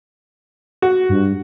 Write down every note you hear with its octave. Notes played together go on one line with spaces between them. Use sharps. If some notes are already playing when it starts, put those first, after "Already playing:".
F#4
G2